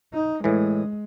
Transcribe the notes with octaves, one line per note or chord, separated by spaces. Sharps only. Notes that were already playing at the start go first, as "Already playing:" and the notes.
D#4
A2 E3 G#3